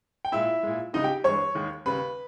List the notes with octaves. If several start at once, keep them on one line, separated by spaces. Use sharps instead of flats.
G5
A#2 G#3 E4 E5
A#2 G#3
C#2 C#3 G3 D#4 D#5
G4 G5
G2 E3 G#3 C#5 C#6
D#2 D#3 G#3
D#2 C#3 G3 B4 B5